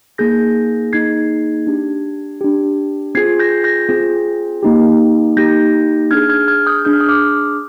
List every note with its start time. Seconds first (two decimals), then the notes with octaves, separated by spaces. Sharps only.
0.18 A#3 D#4 G#4 G6 A#6
0.93 A#3 D#4 G#4 G#6 C7
1.67 D4 G4
2.41 D4 G4
3.15 C4 F4 G#4 G#6 C7
3.40 G6 A#6
3.64 G6 A#6
3.89 C4 F4 G#4
4.63 A#3 D#4 G4
5.37 A#3 D#4 G4 G6 A#6
6.11 D4 G#4 F6 G#6
6.30 F6 G#6
6.48 F6 G#6
6.67 D#6 G6
6.85 D4 G#4 G6
6.93 F6
7.01 D#6
7.09 D6 F6